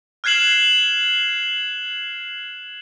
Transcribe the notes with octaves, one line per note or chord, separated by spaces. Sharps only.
F6 F#6 G#6 C7 E7 F#7